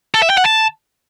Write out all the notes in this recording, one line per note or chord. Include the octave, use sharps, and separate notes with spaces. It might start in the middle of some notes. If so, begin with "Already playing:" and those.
A4
E5
G5
F#5
A5